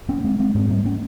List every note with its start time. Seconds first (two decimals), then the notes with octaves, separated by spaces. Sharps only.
0.09 A#3 C#4
0.24 G#3 C4
0.39 G#3 C4
0.55 G#2 G#3 C4
0.70 G3 A#3
0.85 A#3 C#4